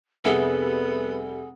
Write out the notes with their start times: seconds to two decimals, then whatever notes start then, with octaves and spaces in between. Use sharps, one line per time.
0.25 F1 G3 B3 G#4 A4 E5 F#5 G#5